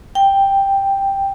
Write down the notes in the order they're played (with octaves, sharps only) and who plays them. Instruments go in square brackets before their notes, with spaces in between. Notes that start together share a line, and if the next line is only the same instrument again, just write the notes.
[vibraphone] G5